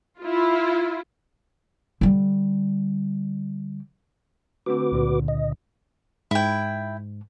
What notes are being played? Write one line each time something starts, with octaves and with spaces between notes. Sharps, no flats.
E4 F4
D3 G3
D3 A3 C4 F#4 B4 D6
C#2 A#2 D3
D#5
G#2 E4 G5